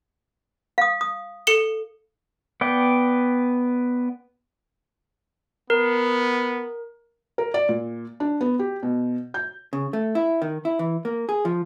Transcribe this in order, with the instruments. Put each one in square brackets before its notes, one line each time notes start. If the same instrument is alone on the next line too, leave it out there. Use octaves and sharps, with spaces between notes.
[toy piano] F5 D#6
D#6
[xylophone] A4 C#7 G7
[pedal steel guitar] B3 D5 G5
[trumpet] B3 [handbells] A#4
[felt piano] A#4
D5
A#2
D4
B3
G4
B2
G6
[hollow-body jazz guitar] C#3
A3
E4
D#3
E4
E3
A#3
G#4
F3